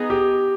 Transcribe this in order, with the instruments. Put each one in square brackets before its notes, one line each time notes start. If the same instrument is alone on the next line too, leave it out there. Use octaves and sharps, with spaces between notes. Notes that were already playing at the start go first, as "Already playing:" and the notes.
Already playing: [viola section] B3 D#4 G#4
[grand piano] G4